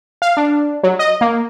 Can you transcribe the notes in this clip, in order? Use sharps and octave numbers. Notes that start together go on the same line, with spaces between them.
F5
D4
F#3
D#5
A#3